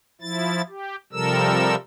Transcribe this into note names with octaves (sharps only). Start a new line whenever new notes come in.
F3 E4 A6
G4
C3 F3 G3 A4 A#4 E6